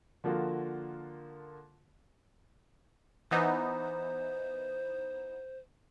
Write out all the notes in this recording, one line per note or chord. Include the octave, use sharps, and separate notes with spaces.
D3 F3 A#3 F4 F#4
E3 B3 D#4 C5